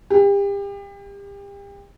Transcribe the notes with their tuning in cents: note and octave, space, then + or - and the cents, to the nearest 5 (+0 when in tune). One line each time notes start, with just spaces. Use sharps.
G4 +35